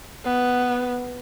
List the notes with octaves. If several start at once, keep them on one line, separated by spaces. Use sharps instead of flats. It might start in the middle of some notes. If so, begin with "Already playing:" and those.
B3